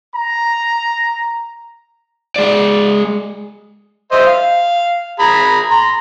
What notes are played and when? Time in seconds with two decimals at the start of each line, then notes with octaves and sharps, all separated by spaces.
0.15 A#5
2.36 G#3 D5
4.12 C5 D#5 E5
4.26 F5
5.19 G#4 A#5 B5
5.71 A#5 C6